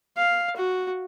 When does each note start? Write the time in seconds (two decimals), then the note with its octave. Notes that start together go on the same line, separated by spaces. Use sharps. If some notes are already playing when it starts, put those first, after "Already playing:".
0.17 F5
0.57 F#4